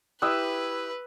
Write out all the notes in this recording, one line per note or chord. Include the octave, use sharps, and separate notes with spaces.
E4 G4 B4 D#6 E6 F#6